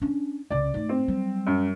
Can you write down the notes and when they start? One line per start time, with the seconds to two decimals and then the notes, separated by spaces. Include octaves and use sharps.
0.02 C#4 D4
0.50 C#2 C#3 D5
0.74 G#2 A3
0.89 C4
1.08 F#3 G3
1.47 F#2